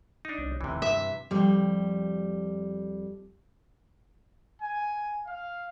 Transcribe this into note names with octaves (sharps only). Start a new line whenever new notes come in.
D4 D#4
C2 C#4
F1 D#2 A2 C3 E3
G2 E5
F2 G3
G#5
F5